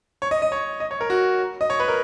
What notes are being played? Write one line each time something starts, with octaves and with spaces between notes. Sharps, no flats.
C#5
D#5
D#5
C#5
D#5
C#5
A#4
F#4
D#5
C#5
B4
A#4